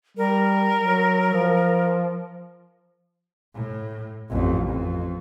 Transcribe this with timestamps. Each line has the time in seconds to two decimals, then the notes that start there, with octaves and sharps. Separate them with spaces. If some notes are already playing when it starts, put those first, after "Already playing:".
0.17 G3 A#4
0.78 F#3
1.33 F3
3.55 A2
4.30 A1 F2
4.68 F2